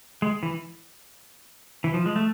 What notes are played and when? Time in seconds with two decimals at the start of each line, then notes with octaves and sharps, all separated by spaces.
0.22 G#3
0.43 E3
1.84 E3
1.94 F3
2.06 G#3
2.16 A3